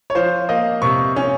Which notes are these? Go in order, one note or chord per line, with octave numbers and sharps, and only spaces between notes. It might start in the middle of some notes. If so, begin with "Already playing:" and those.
C#5
F3 C5
A#3 D#5
C3 C#6
C#4